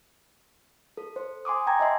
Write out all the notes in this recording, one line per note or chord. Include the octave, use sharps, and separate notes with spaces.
A4
C5
G#5 C6 D6 D#6
G5 A#5 G#6
D#5 E5 A5 C6